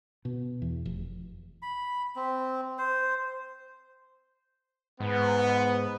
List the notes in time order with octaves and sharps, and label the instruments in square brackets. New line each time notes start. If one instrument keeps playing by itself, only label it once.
[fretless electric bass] B2
E2
F1
[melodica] B5
C4
C5
[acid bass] G#2 [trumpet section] B3